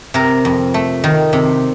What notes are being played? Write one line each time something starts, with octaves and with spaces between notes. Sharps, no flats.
C3 A#4
F2
A3
D#3
C3